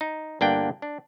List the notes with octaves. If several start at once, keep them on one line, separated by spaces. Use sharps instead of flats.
D#4
G1 A#3 D4 F#5 G5
D4